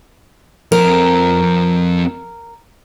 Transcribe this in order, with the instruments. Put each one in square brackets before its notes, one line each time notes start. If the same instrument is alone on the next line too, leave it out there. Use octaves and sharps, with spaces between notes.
[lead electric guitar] F2 C4 [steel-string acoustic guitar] A#4